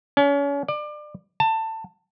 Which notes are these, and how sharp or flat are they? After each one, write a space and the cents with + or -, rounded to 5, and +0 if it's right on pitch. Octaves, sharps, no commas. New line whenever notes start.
C#4 +35
D5 +30
A5 +20